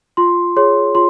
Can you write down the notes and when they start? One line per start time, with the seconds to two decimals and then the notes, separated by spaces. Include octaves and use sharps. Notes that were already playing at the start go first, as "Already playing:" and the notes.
0.17 F4 C6
0.56 G#4 C#5 C6
0.95 F4 C6